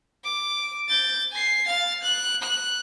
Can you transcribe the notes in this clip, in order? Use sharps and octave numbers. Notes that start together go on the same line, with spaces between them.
D6
G6 A6
G#5 C7
F5 A6
F#6
F#6